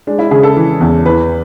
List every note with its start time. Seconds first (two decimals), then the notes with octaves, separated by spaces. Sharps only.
0.07 G#3 D4
0.19 E4
0.31 C#3 G#4
0.43 A4
0.56 E3
0.80 E2
1.06 E3 B4